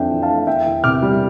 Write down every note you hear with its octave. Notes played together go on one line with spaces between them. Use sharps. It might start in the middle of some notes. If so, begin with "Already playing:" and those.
Already playing: F2 C4 D4 E5 G5
E3
F5 A5
A3
E2 E5 G5
E2
C3 D6 F6
G3